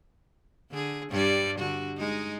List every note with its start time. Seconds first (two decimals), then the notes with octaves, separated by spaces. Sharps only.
0.71 D3 G#4
1.10 G2 G3 D5
1.59 D3 F#4
1.97 G#3 D#4